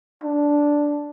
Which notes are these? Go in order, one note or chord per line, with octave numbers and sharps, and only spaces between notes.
D4